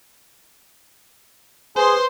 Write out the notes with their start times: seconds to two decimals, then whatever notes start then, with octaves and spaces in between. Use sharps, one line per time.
1.76 G#4 B4 C5 C6